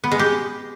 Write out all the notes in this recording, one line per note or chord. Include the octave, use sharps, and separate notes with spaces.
B3
G#3
G4